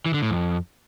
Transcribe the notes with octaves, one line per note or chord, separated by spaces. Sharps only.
E3
D3
A2
F2